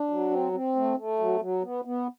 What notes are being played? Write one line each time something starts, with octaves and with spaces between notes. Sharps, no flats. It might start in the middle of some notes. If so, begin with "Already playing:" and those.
Already playing: D4
F#3
C4
C4
A3
A3
F#3
F#3
B3
B3